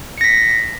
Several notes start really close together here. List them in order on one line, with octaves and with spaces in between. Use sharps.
C#7 A#6 B6